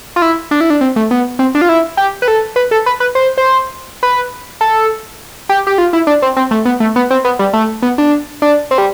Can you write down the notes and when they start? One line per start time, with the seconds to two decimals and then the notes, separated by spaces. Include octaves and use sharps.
0.16 F4
0.22 E4
0.51 D4
0.61 E4
0.70 D4
0.81 C4
0.96 A3
1.11 B3
1.39 C4
1.55 D4
1.61 F4
1.69 E4
1.97 G4
2.22 B4
2.28 A4
2.56 B4
2.71 A4
2.86 B4
3.00 B4
3.15 C5
3.38 C5
4.03 B4
4.61 A4
5.49 G4
5.67 G4
5.78 F4
5.93 E4
6.07 D4
6.22 C4
6.37 C4
6.51 A3
6.65 B3
6.80 A3
6.96 B3
7.11 C4
7.25 B3
7.39 G3
7.53 A3
7.82 B3
7.98 D4
8.42 D4
8.71 C4
8.78 G3